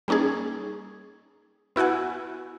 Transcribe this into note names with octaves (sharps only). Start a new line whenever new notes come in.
G3 A#3 C#4 D#4 G#4
B3 E4 F#4 F#5 G#5